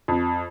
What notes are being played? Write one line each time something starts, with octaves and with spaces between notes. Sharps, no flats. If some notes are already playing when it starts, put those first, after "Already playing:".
F2